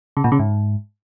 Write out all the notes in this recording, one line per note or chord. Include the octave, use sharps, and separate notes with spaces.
C#3
A#2
C#3
G#2